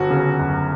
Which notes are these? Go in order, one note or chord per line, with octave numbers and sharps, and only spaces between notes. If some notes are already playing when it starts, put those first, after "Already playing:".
Already playing: G1 F#4
C#3
F#2